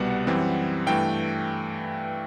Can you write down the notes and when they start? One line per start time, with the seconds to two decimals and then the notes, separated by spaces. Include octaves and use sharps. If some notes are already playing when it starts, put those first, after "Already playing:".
Already playing: C2 B2 G3 B3 F#5
0.27 F#2 E3 G3 C4
0.86 G2 E3 A3 G5